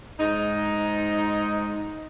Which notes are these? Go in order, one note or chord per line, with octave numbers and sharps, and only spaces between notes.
G#2 D#4